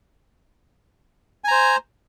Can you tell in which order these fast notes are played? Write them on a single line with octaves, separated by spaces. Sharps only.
G#5 A#5 C5